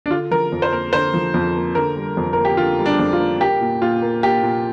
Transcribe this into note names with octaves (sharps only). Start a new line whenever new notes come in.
D4
D3 F4
F3 A#4
F2
C5
A#3 A#4
D3 C5
F3
F2
A#3
D3 A#4
G3
F2
A#3 A#4
G4
D3 F4
G3
D4
F2
F4
A#3
A#3 G4
A#2
A#2 F4
A#3
A#3 G4
A#2